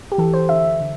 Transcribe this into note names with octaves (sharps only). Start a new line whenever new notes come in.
G4
E3 A4
C5
D3 E5
D3